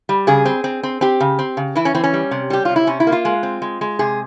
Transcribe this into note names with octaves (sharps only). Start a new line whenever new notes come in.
G3
C#3 G#4
C4
C4
C4
C4 G4
C#3
C4
C#3
E3 E4
C#4
E3 C4
C#4
G3
C3
G3 G4
C3 F4
E4
C3 C#4
E4
A#3
F4
G#3
C4
G#3
G#3
C3 G#4